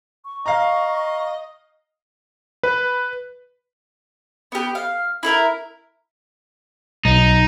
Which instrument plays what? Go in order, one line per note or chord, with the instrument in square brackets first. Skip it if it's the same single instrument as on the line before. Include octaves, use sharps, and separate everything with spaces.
[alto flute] C#6
[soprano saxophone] D#5 [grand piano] F5 A#5
[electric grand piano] B4
[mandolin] B3 G4
F5
E4 A4 A#4
[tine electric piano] B1 [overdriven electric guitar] D#4